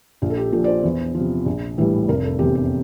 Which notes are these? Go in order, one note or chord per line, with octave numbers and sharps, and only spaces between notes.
A#1 F4
A4
G4
A#2 F3 A4
D5
C5
E2
C3 F3
A#1
A2 E3 G3
F1 A#4
A4
E2 C3 G4
G4